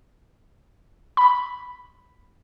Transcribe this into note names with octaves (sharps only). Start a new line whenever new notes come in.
B5